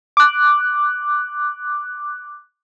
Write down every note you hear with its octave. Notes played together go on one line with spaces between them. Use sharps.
D6 F#6